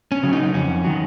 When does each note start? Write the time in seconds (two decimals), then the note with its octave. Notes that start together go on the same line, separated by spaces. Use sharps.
0.12 C#4
0.23 C#3 F#3
0.33 D#4
0.54 F2 C#4
0.84 D#3 F#3